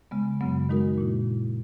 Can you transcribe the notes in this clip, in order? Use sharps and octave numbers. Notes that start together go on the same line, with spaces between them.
C#3 G#3 B3
F#2 C#3 F#3 B3
D#3 G#3 D#4 F#4 A#4
A#2 A#3 E4